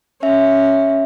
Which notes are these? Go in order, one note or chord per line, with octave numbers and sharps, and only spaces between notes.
C#4 E5